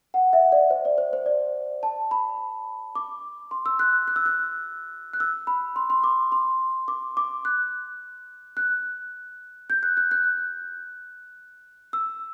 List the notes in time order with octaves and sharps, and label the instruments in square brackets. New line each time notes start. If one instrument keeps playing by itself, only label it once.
[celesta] F#5
E5
D5
C5
D5
C5
C5
D5
A5
B5
D6
C6
E6
F#6
F#6
E6
F#6
F#6
E6
B5
C6
C6
D6
C6
D6
D6
F#6
F#6
G6
F#6
F#6
F#6
E6